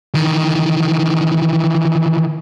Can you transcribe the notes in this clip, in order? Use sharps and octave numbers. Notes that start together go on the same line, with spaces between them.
D#3 E3